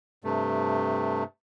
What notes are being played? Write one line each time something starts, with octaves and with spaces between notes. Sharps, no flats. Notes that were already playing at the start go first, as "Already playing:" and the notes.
G2 C3 A3